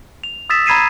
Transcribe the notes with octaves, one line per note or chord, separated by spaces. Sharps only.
F7
D#6 E6 A6 B6 E7
A#5 B5 G#6 C7 D#7 E7